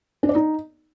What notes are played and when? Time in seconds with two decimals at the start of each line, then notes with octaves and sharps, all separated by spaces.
0.23 D4
0.29 D5
0.35 D#4